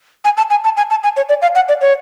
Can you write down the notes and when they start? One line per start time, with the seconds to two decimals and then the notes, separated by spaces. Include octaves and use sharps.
0.25 G#5
0.37 A5
0.50 G#5
0.64 A5
0.77 G#5
0.90 A5
1.04 G#5
1.17 C#5
1.29 D5
1.42 F5
1.55 F#5
1.69 D5
1.81 C#5